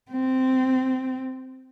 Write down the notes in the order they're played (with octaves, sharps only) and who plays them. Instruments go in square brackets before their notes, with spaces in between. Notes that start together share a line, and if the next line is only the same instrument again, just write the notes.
[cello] C4